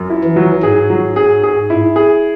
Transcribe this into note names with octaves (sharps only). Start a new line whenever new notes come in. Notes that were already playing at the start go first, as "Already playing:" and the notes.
Already playing: F#2
E4
E3
F#3
G#2 G#4
F#3
G#4
G#4
E4
G#4